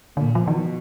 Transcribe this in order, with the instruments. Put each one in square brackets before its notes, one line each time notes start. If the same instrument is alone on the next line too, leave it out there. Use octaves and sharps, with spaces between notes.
[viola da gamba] A#2 [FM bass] D3
[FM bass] F3
[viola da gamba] B2 [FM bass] D#3
[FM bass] F3